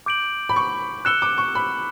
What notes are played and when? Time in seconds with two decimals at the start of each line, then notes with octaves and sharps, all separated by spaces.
0.06 D6 G6 D7 F#7
0.49 B5
0.56 C#6
1.05 E6 F#6 C#7 E7 G7
1.22 D6
1.38 C#6
1.55 B5